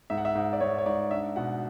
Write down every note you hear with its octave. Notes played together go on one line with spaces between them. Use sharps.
G#2 E5
F#5
E5
G#2
D5
G#2 C#5
C#5
G#2 D5
D4 E5
B2 F#5